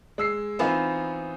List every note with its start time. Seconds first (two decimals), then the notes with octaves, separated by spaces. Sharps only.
0.18 G#3 E6 C7
0.59 E3 B3 C4 D#4 F4